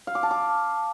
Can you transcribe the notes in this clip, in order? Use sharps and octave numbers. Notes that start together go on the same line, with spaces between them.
F5
D6
A5
D6